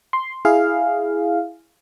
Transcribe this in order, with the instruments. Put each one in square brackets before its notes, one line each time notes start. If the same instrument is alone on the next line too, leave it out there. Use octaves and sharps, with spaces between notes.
[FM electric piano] C6
E4 G#4 F5